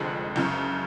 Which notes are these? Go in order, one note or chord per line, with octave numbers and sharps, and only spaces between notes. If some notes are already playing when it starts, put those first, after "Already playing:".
Already playing: F1 F2 D3 G#3 D4
F#1 F#2 C#3